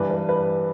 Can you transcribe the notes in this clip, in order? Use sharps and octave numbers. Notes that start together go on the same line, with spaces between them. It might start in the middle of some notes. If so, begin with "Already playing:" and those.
Already playing: G2 E3 B4
B4
B4